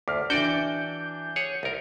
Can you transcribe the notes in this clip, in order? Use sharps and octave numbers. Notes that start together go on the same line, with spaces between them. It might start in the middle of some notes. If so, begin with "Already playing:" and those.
D2 D6 F6
E3 D4 F#4 D5 G5 G6
G#4 C#5 F#5
C2 A#4